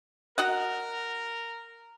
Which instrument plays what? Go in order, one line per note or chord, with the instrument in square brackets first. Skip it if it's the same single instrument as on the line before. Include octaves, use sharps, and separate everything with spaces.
[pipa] F#4 D#5 F#5 [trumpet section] A#4